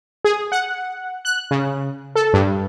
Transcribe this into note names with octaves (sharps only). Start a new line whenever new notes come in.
G#4
F#5
F#6
C#3
A4
G2